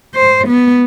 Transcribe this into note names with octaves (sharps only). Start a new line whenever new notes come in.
C5
B3